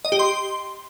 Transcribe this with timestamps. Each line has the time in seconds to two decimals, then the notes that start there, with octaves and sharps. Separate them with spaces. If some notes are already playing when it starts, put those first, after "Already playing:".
0.05 D#5
0.12 G4
0.19 C6